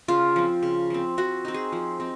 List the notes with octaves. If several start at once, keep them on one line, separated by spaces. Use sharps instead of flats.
C#3 F4
F3 C4
C#3
F3 C4
F3 F#4
C4 D#4
G#4
F3
C4 D#4